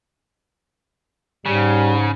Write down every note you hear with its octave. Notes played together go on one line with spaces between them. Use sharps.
G#2 C#3 G3